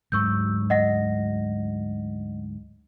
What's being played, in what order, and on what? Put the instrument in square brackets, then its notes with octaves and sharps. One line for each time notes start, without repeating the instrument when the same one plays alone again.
[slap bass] D2 G#2 F#3 [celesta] C#6 E6 G6
[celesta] D#5 F#5 A#6